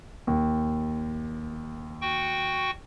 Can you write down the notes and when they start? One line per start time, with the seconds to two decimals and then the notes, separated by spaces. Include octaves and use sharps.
0.27 D#2
2.02 F#4 G5 C#6